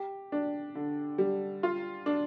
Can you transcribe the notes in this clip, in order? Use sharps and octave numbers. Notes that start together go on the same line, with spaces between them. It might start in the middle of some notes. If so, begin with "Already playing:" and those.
Already playing: G4
D4
D3
G3
F4
D4